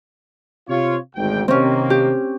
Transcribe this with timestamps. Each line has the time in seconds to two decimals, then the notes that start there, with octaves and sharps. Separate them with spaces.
0.68 C3 F4 C#5
1.15 G#1 D2 G5
1.48 C3 D#3 A#3 C4 C#4
1.90 G4